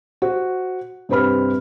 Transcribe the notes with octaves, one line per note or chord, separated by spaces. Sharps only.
F#4 C5
G2 C3 C4 B4 B5 F6